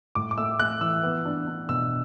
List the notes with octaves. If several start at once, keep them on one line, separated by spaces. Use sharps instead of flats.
A2 D6
D6
A3 E6
A3 F#6
E3 E6
B3
D4
D4
B2 E6